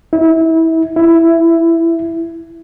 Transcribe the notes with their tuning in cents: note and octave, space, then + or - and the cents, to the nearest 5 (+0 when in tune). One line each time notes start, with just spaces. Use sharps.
E4 -25
E4 +10